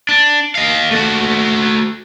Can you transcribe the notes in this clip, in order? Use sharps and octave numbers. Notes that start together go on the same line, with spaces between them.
D4
D#5 F5
A3 F#4